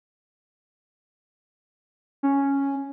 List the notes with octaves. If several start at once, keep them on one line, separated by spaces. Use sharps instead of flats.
C#4